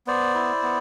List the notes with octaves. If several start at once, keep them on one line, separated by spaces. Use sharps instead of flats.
B3 C5 D5
E4
B3